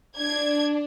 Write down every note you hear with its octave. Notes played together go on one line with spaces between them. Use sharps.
D4 G#6